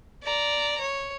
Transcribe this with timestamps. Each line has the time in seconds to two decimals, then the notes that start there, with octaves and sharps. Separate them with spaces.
0.23 D5 A#5
0.81 C#5